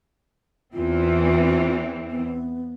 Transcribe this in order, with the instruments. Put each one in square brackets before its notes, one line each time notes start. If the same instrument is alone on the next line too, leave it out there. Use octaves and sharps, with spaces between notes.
[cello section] E2 E3 C4 [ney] F4
[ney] B3